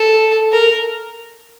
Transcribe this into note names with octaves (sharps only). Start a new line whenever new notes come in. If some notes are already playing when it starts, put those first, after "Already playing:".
Already playing: A4
A#4